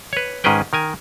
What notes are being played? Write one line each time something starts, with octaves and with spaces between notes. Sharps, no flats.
B4 C#5
G#2 D#3 C#4 G#4 B4 G5
D#3 A#4 G#5